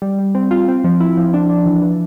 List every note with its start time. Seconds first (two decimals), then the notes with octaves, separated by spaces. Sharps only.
0.02 G3
0.19 G3
0.35 C4
0.51 F4
0.68 C4
0.84 F3
1.00 E4
1.17 F3
1.34 D4
1.50 D4
1.66 E3
1.82 E3